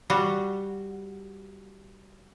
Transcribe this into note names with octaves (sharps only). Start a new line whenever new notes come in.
G3 F#4